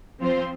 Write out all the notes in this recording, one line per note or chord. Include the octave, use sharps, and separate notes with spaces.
F3 C4 F4 C5